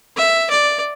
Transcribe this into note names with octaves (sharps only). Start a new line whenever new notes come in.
E5
D5